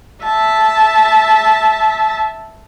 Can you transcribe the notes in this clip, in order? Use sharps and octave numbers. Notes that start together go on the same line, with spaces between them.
E5 A5